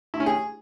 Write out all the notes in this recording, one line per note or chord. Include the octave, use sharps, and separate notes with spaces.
E4
C#4
G#4